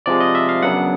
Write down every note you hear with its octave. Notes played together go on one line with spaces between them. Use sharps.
C3 F3 G#3 D5
D#5
E5
F5
F#2 C#3 F#3 B3 D4 F#5